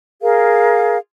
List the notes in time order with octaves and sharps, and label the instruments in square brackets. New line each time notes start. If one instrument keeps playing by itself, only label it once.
[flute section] G#4 A#4 F5